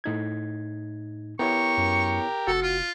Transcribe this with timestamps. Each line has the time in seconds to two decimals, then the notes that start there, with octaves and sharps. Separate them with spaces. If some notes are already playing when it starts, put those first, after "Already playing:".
0.04 A2 D#4 G#6
1.39 B3 E4 G4 A#4 C#5 C#6
1.78 F#2
2.47 F1 F#4 A4
2.63 F4